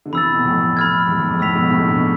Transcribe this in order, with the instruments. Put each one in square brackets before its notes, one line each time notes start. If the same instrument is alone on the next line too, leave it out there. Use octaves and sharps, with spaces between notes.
[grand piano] D3
[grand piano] C3 E3 [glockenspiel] B5 E6 A6
[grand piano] B2
F2 A2
[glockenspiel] B5 F6 G#6
[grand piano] E2 G#2
E2
F2
[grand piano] F2 A2 [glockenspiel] E6 B6 F7
[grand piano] G#2 B2
A2 C3
B2 D3